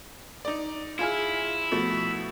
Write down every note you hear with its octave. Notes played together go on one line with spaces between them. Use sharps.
D#4 D5
E4 F4 G#4 F6
B2 F3 A3